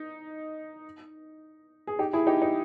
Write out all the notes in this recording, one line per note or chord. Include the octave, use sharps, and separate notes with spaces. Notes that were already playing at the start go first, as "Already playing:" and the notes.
Already playing: D#4
G#4
D#4 G4
E4 G#4
D#4 G4
D#4